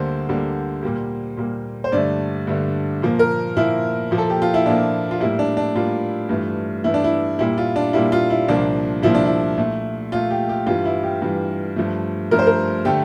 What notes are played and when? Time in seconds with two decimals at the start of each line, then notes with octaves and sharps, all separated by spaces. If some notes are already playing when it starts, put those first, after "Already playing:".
Already playing: D2 D3 G3 A#3 C5
0.28 D2 D3 G3 A#3
0.83 A#2 G3 A#3
1.37 A#2 G3 A#3
1.84 C5
1.92 G2 D3 A3 D5
2.47 G2 D3 A3
3.02 A#2 F3 A#3
3.19 A#4
3.57 A#2 F3 A#3 E4
4.11 A#2 F3 A#3
4.18 A4
4.30 G4
4.42 F4
4.54 E4
4.65 A#2 F3 A#3 D4
5.11 F4
5.20 A2 G3 A#3 E4
5.39 D4
5.57 D4
5.75 A2 G3 A#3 F4
6.29 G2 E3 A3
6.84 G2 E3 A3 E4
6.94 D4
7.04 E4
7.39 A#2 G3 A#3 E4
7.58 F4
7.76 D4
7.93 A#2 G3 A#3 E4
8.12 F4
8.30 E4
8.48 C2 A#2 F3 A#3 D4
9.02 C2 A#2 F3 A#3 E4
9.15 D4
9.25 E4
9.58 A#2 A3
10.12 A#2 A3 F4
10.31 G4
10.49 G4
10.66 G2 E3 G3 F4
10.85 E4
11.03 G4
11.22 G2 E3 G3
11.76 G2 F3 A3
12.31 G2 F3 A3 A#4
12.39 C5
12.47 A#4
12.85 D3 A3 G4